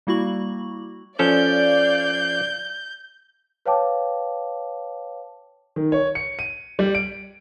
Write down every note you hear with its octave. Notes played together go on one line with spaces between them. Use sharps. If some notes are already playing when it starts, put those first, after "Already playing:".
G3 A#3 E4 F#4 C#6 F#7
F3 C#4 A4 D5 F5 G6
B4 C#5 F5 G5 A5 D6
D#3
C#5
C#7
D#7
G3
D7